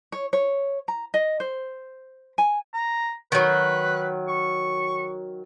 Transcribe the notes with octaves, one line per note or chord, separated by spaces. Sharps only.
C#5
C#5
A#5
D#5
C5
G#5
A#5
D#3 F#3 B4
C#6